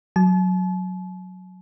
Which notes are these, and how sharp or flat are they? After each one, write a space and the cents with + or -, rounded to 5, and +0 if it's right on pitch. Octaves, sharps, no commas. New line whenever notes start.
F#3 -5 A5 -45